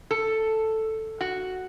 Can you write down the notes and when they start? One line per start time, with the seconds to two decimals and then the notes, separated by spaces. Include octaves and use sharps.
0.11 A4
1.21 F#4